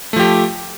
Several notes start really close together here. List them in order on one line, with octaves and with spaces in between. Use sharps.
A3 F3 G4